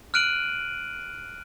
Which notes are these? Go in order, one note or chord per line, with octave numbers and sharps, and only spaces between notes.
F6 F#6 D7 D#7 F#7